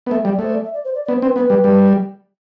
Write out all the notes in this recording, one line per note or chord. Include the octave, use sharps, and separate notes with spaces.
B3
A3 E5
G3
D5
A3 C5
D5
E5
D5
C5
D5
D5
B3
C5
C4
B4
B3 B4
G3
G3